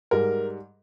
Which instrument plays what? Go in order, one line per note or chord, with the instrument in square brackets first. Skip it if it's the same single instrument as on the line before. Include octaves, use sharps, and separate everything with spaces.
[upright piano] G#2 G3 A#4